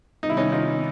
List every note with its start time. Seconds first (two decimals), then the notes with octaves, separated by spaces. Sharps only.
0.22 C3 D#3 G3 B3 D#4
0.30 E4
0.37 C#4 D#4
0.52 D#4 F4